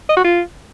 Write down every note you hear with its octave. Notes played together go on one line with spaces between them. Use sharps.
D#5
F#4
F4